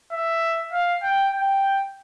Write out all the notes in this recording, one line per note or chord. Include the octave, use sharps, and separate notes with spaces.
E5
F5
G5
G5